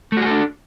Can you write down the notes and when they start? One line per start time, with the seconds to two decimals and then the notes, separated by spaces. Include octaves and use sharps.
0.12 A3
0.17 F#4
0.21 G#4
0.26 A4
0.31 D4